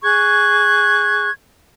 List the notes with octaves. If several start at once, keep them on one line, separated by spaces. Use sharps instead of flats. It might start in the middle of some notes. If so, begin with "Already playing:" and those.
G#4 C#6 F#6 G#6